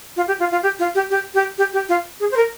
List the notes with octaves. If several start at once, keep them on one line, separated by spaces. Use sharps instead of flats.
F4
G4
F4
F4
G4
F4
G4
G4
G4
G4
G4
F4
G#4
C5
A#4